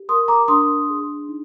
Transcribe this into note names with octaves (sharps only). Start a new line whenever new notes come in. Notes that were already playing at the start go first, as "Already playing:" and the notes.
Already playing: G4
A#4 C6 D#6
A#5 D6
D4 C6 D#6
G#4
D#4